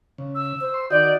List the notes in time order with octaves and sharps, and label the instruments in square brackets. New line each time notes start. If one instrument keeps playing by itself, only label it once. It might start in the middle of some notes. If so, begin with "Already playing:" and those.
[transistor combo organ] C#3
[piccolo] E6
[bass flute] C5
[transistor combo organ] C6
[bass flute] D#3 [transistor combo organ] F#4 D#5 [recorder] D5 [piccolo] G6